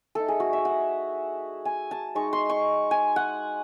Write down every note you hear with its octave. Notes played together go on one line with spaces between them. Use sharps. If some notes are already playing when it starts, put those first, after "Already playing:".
A3 D#4 A4
G#4
F#4
E5
F#5
G#5
A5
G#3 D#4 C#6
C6
C#6
G#5
F#5